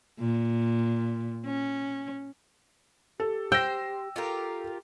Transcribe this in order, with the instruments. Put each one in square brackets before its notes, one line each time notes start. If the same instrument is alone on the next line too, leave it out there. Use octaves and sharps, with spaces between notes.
[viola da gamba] A#2
C#4
[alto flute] G4 [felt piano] A4
[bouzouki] C5 [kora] G5 [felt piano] E6 A#6
[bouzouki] F4 G4 A#4 [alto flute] A4